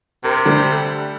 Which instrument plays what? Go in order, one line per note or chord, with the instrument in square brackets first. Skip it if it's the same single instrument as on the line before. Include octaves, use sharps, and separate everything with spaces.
[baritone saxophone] C3 [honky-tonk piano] A#4
[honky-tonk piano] D3 G3 A3